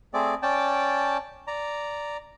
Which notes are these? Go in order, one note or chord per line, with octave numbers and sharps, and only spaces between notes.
A3 C4 G#4 D5
C#4 D5 G5 A5
D5 A#5